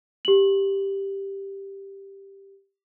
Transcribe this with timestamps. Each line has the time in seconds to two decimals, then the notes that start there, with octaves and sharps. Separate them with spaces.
0.25 G4 F#7